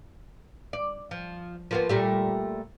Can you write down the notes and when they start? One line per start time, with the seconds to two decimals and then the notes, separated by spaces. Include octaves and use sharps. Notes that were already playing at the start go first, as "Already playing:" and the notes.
0.73 D5
1.11 F3
1.71 F3 A#3 B3
1.89 A#2 G3 A3